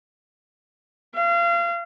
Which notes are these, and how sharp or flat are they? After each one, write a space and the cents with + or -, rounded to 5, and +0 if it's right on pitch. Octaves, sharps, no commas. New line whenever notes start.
F5 -30